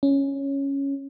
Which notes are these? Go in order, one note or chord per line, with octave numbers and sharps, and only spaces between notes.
C#4